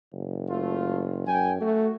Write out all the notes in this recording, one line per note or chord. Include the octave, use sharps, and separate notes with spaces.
F#1
A3 F4
F#2 G5 G#5
A3 F#4